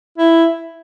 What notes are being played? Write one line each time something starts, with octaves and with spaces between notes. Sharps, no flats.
E4